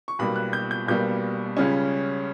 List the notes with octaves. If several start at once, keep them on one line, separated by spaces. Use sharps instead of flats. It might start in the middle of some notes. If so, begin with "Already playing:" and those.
C#6
B1 B2 G3 A#3 B5
F#6
G6
G6
B1 B2 G3 A#3 G6
C#2 C#3 G3 C#4